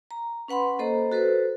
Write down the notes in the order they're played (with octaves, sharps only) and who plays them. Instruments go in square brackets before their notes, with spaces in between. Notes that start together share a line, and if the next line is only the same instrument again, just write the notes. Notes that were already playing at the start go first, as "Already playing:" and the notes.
[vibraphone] A#5
C#4 B4 F#5 B5 C6
A#3 A4 C5 D#5 A#5
F#4 A4 B4 C5